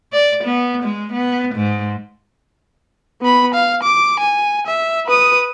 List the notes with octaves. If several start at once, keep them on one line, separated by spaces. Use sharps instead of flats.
D5
B3
G#3
B3
G#2
B3 B5
F5
D6
G#5
E5
B4 D#6